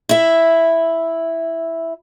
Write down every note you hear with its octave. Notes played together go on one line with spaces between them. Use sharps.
E4 E5